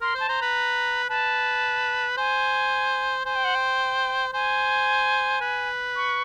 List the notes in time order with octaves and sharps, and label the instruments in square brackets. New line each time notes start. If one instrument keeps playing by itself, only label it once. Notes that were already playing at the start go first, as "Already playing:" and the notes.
[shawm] A#4 [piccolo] C6
[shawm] C5
[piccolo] A5
[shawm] C5 [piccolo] A#5
[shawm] B4
[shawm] B4 [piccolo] A5
[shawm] C5 [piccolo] G#5
[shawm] C5 [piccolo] G#5
[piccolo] G5
F#5
G5
[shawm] C5 [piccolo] G#5
[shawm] B4
[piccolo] C#6